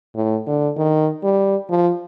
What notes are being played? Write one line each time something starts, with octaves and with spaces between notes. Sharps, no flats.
A2
D3
D#3
G3
F3